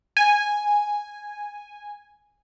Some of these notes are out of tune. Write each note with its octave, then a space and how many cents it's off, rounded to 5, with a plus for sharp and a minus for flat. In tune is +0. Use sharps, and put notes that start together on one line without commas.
G#5 -10